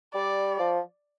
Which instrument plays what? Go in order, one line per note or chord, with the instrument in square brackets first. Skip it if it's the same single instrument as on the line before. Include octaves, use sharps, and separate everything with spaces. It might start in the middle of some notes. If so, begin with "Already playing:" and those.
[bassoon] G3 [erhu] D5
[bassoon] F3